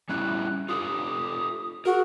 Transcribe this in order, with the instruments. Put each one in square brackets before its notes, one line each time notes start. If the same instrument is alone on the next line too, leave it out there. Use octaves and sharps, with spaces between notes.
[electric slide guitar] G3 C#4 E4 [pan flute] F#6
[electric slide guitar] F4 G4 A4 [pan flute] D#6
[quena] F#4 [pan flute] G#4 [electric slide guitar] A#4